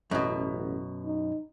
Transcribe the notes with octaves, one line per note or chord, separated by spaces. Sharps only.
A1 F#2 B2
D#4